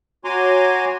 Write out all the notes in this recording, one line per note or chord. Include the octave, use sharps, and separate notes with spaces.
F#4 C#5 G#5 A#5 C6 D6